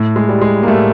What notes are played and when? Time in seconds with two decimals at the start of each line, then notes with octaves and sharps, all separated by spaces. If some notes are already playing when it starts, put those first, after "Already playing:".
Already playing: A2
0.16 G#3
0.29 G3
0.41 G#3
0.63 A#3
0.68 A2 G3 A3